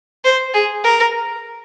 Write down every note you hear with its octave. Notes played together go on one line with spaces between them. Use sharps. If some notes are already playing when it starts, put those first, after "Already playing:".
C5
G#4
A#4